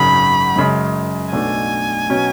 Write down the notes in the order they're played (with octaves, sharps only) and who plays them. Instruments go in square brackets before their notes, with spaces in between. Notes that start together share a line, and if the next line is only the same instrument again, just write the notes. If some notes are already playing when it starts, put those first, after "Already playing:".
Already playing: [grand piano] G#1 F#2 C#3 [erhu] B5
[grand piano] F#2 C#3 G#3
[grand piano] B1 B2 A3 D4 [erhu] G#5
[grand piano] B2 F#3 C#4